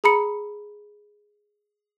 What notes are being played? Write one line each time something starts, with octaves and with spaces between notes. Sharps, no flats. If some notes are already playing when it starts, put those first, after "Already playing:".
G#4 A#5 B5 C#7